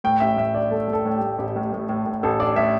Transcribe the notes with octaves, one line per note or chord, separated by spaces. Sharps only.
A2 G5
A1 E5
A2 E5
D4 D5
A3 A4
A3
A4
A2
G4
A2
A1 G4
A2
A2
A2
A2
A1 A4
D4 D5
A2 E5